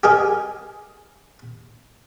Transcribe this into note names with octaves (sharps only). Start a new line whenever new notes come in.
G4 G#4 A#4 D#5